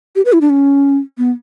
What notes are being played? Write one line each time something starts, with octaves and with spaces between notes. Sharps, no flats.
G4
B4
E4
D4
C#4
B3